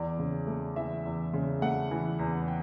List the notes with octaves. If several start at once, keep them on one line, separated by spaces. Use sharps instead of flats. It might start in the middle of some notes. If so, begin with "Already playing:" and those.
Already playing: E2 D5
C#3
A3
E3 E5
E2
C#3
A3 F#5
E3
E2
G5